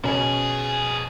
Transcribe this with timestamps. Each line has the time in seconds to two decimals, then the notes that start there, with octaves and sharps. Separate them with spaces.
0.04 B2 F3 C#4 G#4